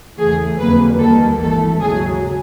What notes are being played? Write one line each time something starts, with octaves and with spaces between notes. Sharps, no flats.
E2 C#3 E3 A3 G#4
F2 D3 F#3 A#3 B4
D#2 D#3 G3 A#3 A4
G#1 G2 E3 A3 A4
D#2 C#3 F#3 G#4